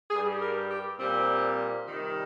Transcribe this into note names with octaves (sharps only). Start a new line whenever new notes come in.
G2 G3 G#4
A#4
G4
A#2 G3 C4
C3 D#3 G3